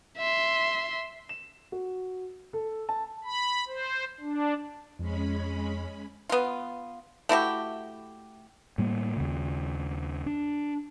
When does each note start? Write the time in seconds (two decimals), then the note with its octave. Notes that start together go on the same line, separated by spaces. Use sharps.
0.18 E5 C6
1.29 E7
1.72 F#4
2.53 A4
2.89 A5
3.24 B5
3.67 C5
4.20 D4
4.99 F2 G#3 C#4 B5
6.29 B3 F4
7.29 A3 E4 F#4 G4
8.78 A2 G3 A#3
9.17 D#2 C#3
10.26 D4